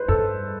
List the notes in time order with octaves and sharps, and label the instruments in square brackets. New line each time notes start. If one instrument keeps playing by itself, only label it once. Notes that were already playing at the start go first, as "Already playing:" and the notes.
Already playing: [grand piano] B4 C5
[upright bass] G2 [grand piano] A4